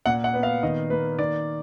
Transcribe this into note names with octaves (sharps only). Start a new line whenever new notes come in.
A#2 F#5
F#5
B3
F5
D#3 D#5
A#3 B4
D#3 D5